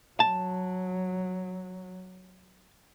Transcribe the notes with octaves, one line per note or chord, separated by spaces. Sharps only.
F#3 A5